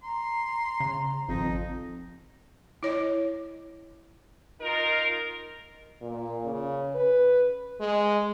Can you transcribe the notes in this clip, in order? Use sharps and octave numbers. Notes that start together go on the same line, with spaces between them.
A#5 C6
C#3
G#1 F2 D#4
E4 C#5 D#5
D#4 F4 A#4
A#2
C#3
B4
G#3